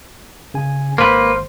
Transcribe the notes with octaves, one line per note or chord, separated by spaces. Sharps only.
C#3 G#5
G#1 A#3 B4 C5 C6